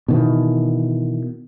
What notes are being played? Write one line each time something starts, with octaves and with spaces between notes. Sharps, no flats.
B2 D#3 E3